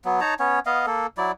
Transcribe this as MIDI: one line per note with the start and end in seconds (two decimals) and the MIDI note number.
0.05 0.20 54
0.05 0.20 59
0.21 0.34 63
0.21 0.34 73
0.21 0.34 81
0.21 0.34 82
0.39 0.59 59
0.39 0.59 61
0.39 0.59 73
0.66 0.86 59
0.66 0.86 75
0.66 0.86 77
0.86 1.07 58
0.86 1.07 69
1.18 1.32 54
1.18 1.32 64
1.18 1.32 74